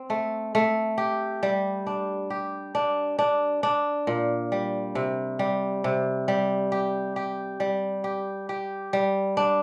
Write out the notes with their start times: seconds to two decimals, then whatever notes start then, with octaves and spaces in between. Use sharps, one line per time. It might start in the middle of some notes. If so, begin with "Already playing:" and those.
Already playing: C4
0.10 A3
0.55 A3
0.98 G4
1.43 G3
1.87 D4
2.30 G4
2.75 D4
3.19 D4
3.63 D4
4.07 A#2
4.52 G3
4.95 C3
5.39 G3
5.84 C3
6.28 G3
6.72 G4
7.16 G4
7.60 G3
8.04 G4
8.49 G4
8.93 G3
9.37 D4